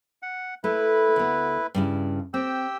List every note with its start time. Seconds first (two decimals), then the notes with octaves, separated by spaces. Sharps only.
0.22 F#5
0.64 A3 E4 B4
1.16 D2 B3
1.74 G2 C#3 E4
2.34 C4 G4 G5 E6